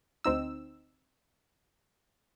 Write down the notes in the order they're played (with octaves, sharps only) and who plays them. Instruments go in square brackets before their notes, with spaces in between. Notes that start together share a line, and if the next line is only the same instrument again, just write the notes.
[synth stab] D2 C4 D#4 E6